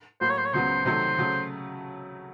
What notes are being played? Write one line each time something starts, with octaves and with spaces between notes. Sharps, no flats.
A2 F#3 A#3 C5
C#5
C5
C#5
C#2 C#3 F#3 B3 C5
C3 D#3 F#3 A3 C5
C#3 F#3 A3 C#4